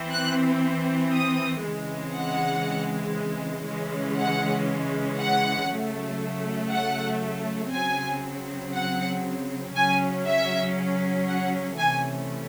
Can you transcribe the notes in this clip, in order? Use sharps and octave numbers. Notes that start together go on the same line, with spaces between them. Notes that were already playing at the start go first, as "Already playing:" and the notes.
Already playing: E3 C4
F#6
D#6
C#3 E3 G#3 C4
F#5
C#3 E3 G#3 C#4
F#5
F#5
C#3 F#3 A3
F#5
C#3 F#3 C4 G#5
F#5
C#3 F#3 C#4 G#5
E5
F#5
C3 E3 A3 C#4 G#5